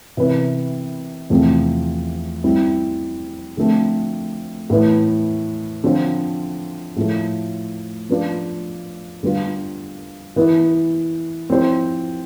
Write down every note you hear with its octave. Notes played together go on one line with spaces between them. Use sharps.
C3 E3 B3 E4 B4
E2 C3 F3 A3 C4
G3 C4 E4
D3 F3 A3 C4
A2 E3 B3 E4 B4
D3 F3 C4 F4 C5
A2 F3 A3
F3 B3 D4 F4
D3 G3 B3 F4
E3 B3 E4 B4
F3 C4 E4 G4 C5